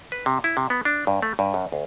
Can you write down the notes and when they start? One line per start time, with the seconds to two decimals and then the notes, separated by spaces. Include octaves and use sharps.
0.12 B4
0.26 C3
0.44 E4
0.57 C3
0.70 B3
0.85 D4
1.07 G2
1.22 A3
1.39 G2
1.54 F#2
1.72 D2